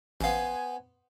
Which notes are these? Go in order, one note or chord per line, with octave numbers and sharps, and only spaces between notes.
A1 B3 C5 F5 G#5